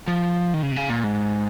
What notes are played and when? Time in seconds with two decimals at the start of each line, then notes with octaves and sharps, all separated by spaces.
0.08 F3
0.54 D#3
0.62 C#3
0.72 C3
0.76 C#3
0.89 A#2
1.04 G#2